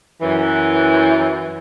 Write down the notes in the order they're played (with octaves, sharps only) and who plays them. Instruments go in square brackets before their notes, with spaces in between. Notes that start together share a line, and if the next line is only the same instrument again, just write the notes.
[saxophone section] F#2 E3